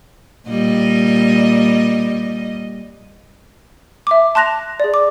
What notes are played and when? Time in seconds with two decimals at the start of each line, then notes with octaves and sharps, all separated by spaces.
0.46 A#2 G3 D#5
4.07 E5 D6
4.35 A5 C6 F#6 A#6 F7
4.80 G#4 D5
4.94 D6